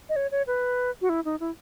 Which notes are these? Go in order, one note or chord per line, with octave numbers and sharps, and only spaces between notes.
D#5
C#5
C#5
B4
F#4
E4
D#4
E4